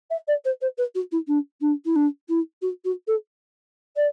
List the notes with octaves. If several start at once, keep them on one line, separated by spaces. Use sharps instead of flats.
E5
D5
C5
C5
B4
F#4
E4
D4
D4
E4
D4
E4
F#4
F#4
A4
D5